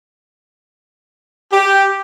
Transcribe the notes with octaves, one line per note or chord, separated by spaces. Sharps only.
G4